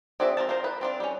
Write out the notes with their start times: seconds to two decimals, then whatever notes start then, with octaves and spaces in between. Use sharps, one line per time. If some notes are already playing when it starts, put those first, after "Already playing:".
0.20 C4 F#4 G#4 D5 E5
0.37 C4 G#4 A#4 A5
0.49 F4 A#4 C5
0.64 B4
0.81 C4 D4 F4
1.00 G3 C#4